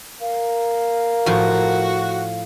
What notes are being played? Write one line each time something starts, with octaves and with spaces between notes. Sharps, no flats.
A#4 F5
A2 F3 F#4